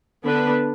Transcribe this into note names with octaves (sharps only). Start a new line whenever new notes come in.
D3 B3 D4 B4